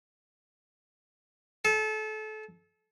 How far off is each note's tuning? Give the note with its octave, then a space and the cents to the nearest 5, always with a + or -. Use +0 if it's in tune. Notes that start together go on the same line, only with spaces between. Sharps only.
A4 -30